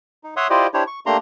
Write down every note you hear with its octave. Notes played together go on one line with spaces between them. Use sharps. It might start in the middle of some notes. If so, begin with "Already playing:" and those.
D#4
C#5 E5 F#5 C6 D#6
E4 F4 G4 C5 D5 D#5
D4 E4 G4 C5 C#5
C#6
A3 A#3 D4 G4 A#5 C6